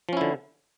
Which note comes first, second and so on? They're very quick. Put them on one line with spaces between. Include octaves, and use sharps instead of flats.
F3 C#4 E4 D3